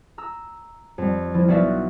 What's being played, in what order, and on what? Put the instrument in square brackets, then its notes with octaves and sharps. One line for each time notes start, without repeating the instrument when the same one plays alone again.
[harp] A#5 E6
F2 G3
F3 E4
B1 B3 F#4 D5 E5 F5